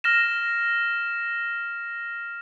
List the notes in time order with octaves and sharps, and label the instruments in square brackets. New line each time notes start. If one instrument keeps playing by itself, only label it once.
[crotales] F6 A#6 E7